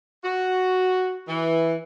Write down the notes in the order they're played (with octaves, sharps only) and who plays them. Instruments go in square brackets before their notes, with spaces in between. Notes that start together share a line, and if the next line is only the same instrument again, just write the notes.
[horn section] F#4
E3